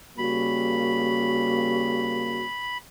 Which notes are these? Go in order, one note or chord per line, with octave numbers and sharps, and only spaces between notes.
C#3 G3 A#3 F#4 B5